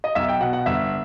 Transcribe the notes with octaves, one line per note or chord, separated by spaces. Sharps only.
D#5
B1 E5
G5
B2 F#5
F#5
G1 E5